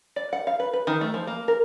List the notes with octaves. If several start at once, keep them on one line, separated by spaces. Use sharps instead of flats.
D5
F#5
F5
B4
B4
D#3
A3
F3
A#3
A#4